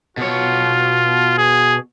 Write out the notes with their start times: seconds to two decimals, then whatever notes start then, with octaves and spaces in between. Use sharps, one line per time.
0.17 B2 F4 C#5
1.38 G#4